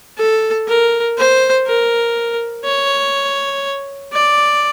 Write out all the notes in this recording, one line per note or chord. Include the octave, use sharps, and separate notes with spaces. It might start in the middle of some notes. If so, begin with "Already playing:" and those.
A4
A#4
C5
A#4
C#5
D5